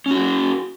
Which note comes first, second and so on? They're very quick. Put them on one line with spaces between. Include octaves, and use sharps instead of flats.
C#4 F#4 G#4